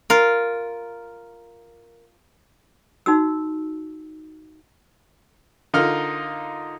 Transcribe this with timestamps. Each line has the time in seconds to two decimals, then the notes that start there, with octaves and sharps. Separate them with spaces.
0.10 F4 A#4
3.06 D#4 F#4 E6
5.74 D3 D#4 F4 A#4 F6